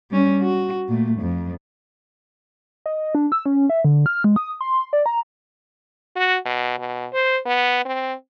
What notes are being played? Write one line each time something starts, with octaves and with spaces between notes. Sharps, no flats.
G3 C#4
F#4
A#2 A3
F2
D#5
D4
E6
C#4
E5
D3
F6
G#3
D#6
C6
D5
A#5
F#4
B2
B2
C5
B3
C4